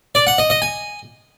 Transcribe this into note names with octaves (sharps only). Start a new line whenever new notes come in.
D5
F#5
D#5
D#5
G#5